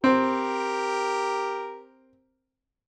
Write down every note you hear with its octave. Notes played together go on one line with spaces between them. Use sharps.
C4 G4 A#4